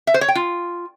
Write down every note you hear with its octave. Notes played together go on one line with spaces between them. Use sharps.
E5
C5
C#5
G5
F4